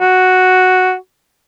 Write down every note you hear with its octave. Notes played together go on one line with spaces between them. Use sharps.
F#4